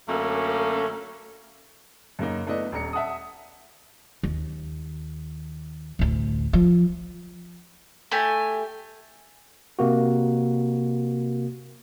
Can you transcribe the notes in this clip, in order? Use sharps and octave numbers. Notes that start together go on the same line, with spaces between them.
F#2 D3 A3 A#3 C#4
F#2 C#3 A#3 D#4
A3 B3 D4 E4 D#5
D#1 D4 A#5 C#7
E5 F#5 A5 D#6
D#2
A1 D2
F3
A3 G4 G#5
C3 A#3 F#4